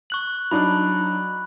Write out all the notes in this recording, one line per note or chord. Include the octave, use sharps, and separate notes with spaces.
C#6 F#6 F#7
F#3 D4 D#4 B5 F#6